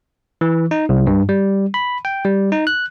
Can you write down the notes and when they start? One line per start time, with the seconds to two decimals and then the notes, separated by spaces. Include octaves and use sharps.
0.41 E3
0.71 D#4
0.89 C2
1.07 G2
1.29 G3
1.74 B5
2.05 G5
2.25 G3
2.52 D#4
2.67 F#6